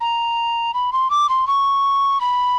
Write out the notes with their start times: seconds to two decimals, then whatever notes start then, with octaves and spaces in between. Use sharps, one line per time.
0.01 A#5
0.74 B5
0.93 C6
1.11 D6
1.29 C6
1.48 C#6
2.21 B5